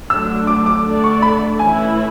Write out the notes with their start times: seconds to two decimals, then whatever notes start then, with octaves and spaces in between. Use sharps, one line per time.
0.10 D3 F#3 A3 D4 E6
0.47 D6
0.66 D6
0.84 D3 A3 D4 A4 D5
1.04 C#6
1.22 B5
1.59 E3 A3 C#4 E4 G#5